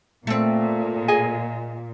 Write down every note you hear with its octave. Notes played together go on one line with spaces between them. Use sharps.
A#2 A3 C4
G#4 D#5 G#5